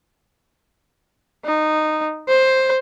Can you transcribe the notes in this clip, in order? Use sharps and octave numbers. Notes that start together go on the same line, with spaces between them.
D#4
C5